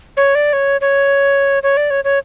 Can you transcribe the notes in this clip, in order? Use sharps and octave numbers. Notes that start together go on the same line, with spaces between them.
C#5
D5
C#5
C#5
C#5
D5
C#5
C#5